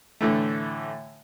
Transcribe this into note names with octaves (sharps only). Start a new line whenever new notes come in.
A2 D3 E3 A3